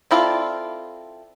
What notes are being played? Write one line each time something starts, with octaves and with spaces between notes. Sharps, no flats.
C4 E4 F4 A4 D5